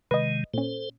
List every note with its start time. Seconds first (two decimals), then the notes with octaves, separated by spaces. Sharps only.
0.11 C3 D#3 G#3 B4 D#5
0.54 A#2 C#4 A4 C5